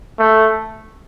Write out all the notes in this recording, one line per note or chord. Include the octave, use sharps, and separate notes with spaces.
A3